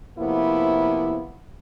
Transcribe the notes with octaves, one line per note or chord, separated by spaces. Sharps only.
C3 F3 A#3 B3 E4